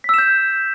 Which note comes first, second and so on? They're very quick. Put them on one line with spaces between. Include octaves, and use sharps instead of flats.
B6 E6 E7 G6